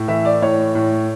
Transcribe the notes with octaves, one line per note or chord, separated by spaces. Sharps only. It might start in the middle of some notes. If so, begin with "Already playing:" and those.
Already playing: A2
E3 E5
D5
A2 C#5
A2